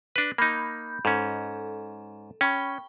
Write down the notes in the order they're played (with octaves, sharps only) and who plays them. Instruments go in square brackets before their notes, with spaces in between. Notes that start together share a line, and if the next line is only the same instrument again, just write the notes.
[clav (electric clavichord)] D4 B4
[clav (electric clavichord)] A#3 D#4 [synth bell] B5 G6
[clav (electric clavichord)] G#2 C#4 [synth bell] A4
[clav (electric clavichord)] C#4 [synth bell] G5 B5 C#6